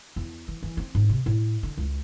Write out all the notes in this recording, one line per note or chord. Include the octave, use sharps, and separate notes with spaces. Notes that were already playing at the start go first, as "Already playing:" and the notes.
E2
E3
E3
C4
G#2
C3
A2
D3
C#2